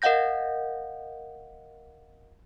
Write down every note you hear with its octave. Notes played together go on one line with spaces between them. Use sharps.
A#4 D#5 F5 F#5 G6 A#6